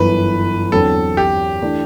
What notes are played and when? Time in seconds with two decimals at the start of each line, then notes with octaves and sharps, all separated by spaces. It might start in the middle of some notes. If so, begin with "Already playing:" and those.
Already playing: G1 F#2 E3 B4
0.72 E2 D3 F#3 C4 A4
1.17 G4
1.62 E3 A3 D4